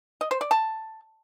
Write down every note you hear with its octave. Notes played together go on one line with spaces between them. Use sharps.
D#5
C5
D5
A5